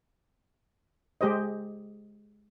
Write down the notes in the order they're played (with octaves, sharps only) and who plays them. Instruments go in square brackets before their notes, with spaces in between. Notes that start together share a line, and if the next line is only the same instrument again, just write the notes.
[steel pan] G#3 G4 C5 D#5